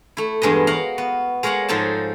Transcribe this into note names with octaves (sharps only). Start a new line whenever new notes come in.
A3 E4
E2 G2 G#3 B4 D#5
F#4 A#4 F5 F#5 C6
B3
G#3 A#4 C#5 F5 F#5
G#2 F3 G#3 D#4 A4 A5